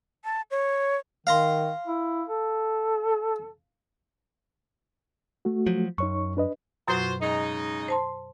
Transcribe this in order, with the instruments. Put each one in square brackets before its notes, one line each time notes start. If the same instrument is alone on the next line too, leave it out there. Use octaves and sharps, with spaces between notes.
[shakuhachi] A5
C#5
[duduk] D#3 [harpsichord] F5 A#5 C6
[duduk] E4
A4
[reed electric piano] A3 F#4
[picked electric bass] F3 F#3
[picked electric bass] F#2 [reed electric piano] D#4 C#5 C#6
[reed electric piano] D4 B4 D#5
[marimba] F#2 B2 F#3 [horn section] F4 F#4 C5
[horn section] C#3 G#3 D#4
[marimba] C5 A5 C6